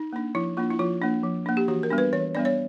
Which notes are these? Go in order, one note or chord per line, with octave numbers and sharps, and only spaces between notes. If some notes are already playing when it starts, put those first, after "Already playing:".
Already playing: D#4
A#3 D4
F3 E4
A#3 D4 F4
E4
F3 F4
A#3 D4
F3
A#3 D4
G4
E3 F#4
A#4
G3 B3 D4
B4
E3 C#5
G3 B3 D4 D5
C#5